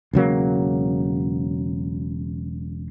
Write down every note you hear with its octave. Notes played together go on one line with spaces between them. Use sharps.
E1 C#3 F#3 A#3